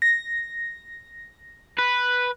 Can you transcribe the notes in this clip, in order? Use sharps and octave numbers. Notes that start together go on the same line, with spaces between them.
A#6
B4